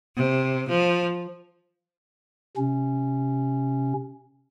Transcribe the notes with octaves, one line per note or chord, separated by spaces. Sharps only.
C3
F3
C3 C#4